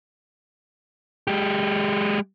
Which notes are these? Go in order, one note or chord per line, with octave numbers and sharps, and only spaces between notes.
G#3 G4